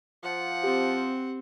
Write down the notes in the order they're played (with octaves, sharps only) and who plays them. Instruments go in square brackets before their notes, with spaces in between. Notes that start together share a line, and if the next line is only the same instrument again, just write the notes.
[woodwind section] F3 [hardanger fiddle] F#5
[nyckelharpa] C4 [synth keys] G4